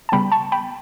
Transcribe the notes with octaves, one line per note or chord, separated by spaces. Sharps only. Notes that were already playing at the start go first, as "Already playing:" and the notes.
A5
C#3 G3 B3 G5 B5
A5 C#6
G5 B5